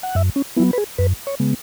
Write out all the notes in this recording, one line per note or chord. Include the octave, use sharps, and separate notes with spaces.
F#5
F#2 E5
C#4
F#3 B3 E4
B4
G#4
F#2 B4
C#5
C#3 G#3 B3